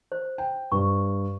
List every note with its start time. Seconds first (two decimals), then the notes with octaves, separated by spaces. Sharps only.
0.12 C5
0.38 G5
0.72 G2 C#6